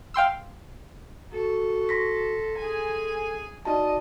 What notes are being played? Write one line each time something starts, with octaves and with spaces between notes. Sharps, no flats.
F5 G5 C6 E6
F#4 A4
C6 A#6 B6
G#4 A4 G#5
D#4 F#4 D5 D#5 A5